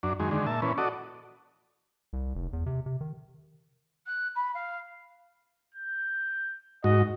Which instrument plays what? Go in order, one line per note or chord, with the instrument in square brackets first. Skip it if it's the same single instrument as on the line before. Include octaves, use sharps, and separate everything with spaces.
[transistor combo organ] F#2 D4
F#2 D#3 G#3
D3 D#3 G#3
A#2 E5 A5
A#2 E3 C#4 B4
F#4 A4 D5 D#5
[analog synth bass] C2
F1
E2
C3
C3
D#3
[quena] F#6
B5
F5
[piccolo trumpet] G6
[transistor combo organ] G#2 F#4 [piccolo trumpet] D#5